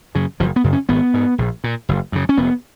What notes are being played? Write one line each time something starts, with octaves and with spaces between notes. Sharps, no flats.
F#2 C#3
F#1 F3
B3
F#2 C#3
C#4
G#1 B3
G#2
A#1
A#2
F#1
F#2 C#3
C#4
F1 B3